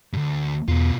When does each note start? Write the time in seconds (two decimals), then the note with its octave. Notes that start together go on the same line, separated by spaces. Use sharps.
0.13 D2 G2
0.68 E2 B2 F4